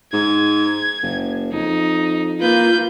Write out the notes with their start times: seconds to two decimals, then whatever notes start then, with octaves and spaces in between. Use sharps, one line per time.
0.13 G#2 G#6
1.03 F#1
1.52 F2 D#4
2.41 A#3 F4 B4 G6